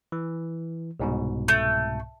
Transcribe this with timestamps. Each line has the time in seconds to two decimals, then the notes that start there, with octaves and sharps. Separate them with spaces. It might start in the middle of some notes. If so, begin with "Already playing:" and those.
0.12 E3
1.00 C2 G#2 B2
1.48 A3